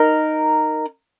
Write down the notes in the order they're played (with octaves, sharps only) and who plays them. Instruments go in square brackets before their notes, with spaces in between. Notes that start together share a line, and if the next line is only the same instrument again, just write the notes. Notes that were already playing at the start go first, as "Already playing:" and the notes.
Already playing: [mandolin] D#4 A#4